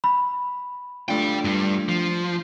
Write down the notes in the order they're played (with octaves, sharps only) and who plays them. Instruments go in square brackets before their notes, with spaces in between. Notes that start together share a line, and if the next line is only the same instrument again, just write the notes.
[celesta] B5
[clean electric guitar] A3 D4 F4 [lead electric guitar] D5 G5
[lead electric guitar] G2 G3
F3